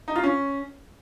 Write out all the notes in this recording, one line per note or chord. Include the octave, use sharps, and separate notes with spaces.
D#4
F4
C#4